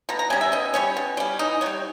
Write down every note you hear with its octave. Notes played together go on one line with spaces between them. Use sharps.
B2 A#5
A#5
G3 C#4 G#5
E5
B2 D#5
G3 C#4 C#5
B2
G3 C#4
E3 D#4
G3 B3 C#5